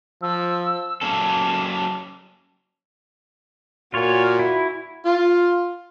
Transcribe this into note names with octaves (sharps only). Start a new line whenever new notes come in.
F3 E6
F#3 A#3 C#4 A4
A#2 F4 F#4 C#5
E4
F4